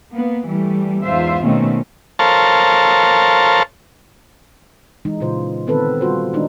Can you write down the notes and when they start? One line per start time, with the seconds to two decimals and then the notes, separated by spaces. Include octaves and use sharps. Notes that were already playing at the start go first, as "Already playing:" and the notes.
0.14 A#3 B3
0.48 E3 G3 A3
1.03 E2 G#2 F4 C5 E5
1.45 B2 D#3 A3 A#3 C4 C#4
2.19 A4 A#4 C5 C#5 F5 A5
5.05 E3 G#3 D#4
5.20 A#2 C#3 F4 C5
5.67 D3 D#3 B3 C4 A4 B4
6.01 G3 F4 F#4 C5
6.33 D#3 G#3 D4 D#4